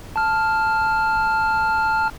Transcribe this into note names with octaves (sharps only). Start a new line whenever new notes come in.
A5 F6